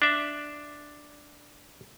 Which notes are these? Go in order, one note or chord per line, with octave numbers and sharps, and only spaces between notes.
D4 E5